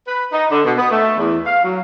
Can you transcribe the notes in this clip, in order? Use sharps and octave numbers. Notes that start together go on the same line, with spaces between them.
B4
D#4
D3
B2
B3
A3
E2
F5
F#3